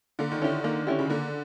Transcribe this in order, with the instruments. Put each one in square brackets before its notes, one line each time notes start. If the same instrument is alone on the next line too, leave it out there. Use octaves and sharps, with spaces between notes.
[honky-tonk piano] D3 [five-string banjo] A#3
[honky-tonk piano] D#3
[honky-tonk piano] D3 [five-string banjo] C#4 E4 G4
[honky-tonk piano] D#3 [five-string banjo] A#3
[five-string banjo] C#4 E4 G4
[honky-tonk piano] C#3
[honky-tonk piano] D3 [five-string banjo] A#3